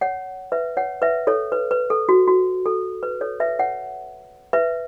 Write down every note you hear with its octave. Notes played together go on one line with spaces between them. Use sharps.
C#5 F#5
B4 E5
C#5 F#5
B4 E5
A4 C#5
B4
B4
A4
F#4
F#4
A4
B4
A4 C#5
B4 E5
C#5 F#5
B4 E5